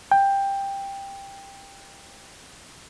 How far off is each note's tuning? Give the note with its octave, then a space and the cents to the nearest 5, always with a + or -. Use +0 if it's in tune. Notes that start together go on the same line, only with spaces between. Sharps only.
G5 +15